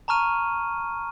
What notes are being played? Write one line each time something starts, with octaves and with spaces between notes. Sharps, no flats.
A5 A#5 C#6 F6 D#7